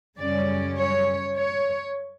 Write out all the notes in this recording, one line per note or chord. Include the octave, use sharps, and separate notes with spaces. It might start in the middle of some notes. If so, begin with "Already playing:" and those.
F#2 C#3 G3 C#4 D5
C#5
C#5